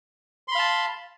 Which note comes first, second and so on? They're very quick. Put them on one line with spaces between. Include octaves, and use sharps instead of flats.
C6 B5 F5 A5